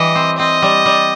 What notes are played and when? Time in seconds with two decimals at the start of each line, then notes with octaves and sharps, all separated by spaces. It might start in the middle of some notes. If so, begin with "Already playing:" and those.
Already playing: E3 G3 D#5
0.15 C4
0.39 C4 D#5
0.62 G3
0.86 G3